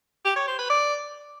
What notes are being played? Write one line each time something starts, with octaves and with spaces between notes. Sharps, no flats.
G4
C#5
C5
B4
D5